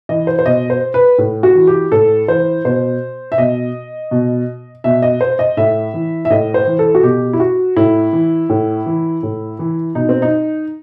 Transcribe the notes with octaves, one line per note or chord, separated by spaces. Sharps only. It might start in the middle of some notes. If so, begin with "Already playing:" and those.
E3 D#5
C5
C5
B2 D#5
C5
B4
A2
F#4
E3
G4
A2 A4
E3 C5
B2 C5
E5
B2 D#5
B2
B2 E5
D#5
C5
D#5
A2 E5
E3
E5
A2 D#5
C5
E3
A4
F#4
B2 G4
E4
F#4
A2 E4
E3
A2
E3
A2
E3
B2 D#4
C4
D#4